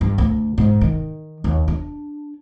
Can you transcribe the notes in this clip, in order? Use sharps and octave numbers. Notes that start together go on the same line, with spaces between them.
G2
D2
G#2
D#3
D#2
D4